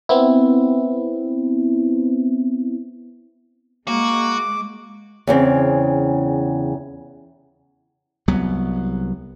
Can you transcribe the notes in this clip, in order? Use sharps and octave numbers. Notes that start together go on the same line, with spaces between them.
B3 C4 E4
G#3 A#3 F#4 D6
E2 C#3 C4
C2 F#3 B3